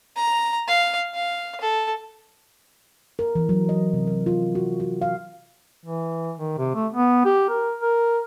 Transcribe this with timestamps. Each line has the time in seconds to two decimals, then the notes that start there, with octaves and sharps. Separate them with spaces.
0.16 A#5
0.68 F5
1.14 F5
1.61 A4
3.19 A#4
3.35 E3
3.49 F#3
3.69 D#5
3.93 C3
4.07 A#4
4.26 F4
4.55 F#4
4.80 F#4
5.02 F5
5.86 E3
6.37 D#3
6.58 C3
6.75 A3
6.94 B3
7.25 G4
7.49 A#4
7.81 A#4